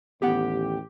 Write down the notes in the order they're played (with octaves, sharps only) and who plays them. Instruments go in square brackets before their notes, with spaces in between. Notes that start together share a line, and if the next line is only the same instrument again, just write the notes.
[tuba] A1 [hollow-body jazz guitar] D#2 B3 F#5 [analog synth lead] G4